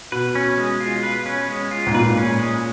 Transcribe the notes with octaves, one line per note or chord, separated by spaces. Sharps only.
B2 B4
C#4
G#3
F4
B4
C#4
G#3
F4
G#2
A#2 B4
C#4
G#3